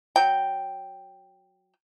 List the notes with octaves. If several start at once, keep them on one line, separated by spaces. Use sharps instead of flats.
F#3 G5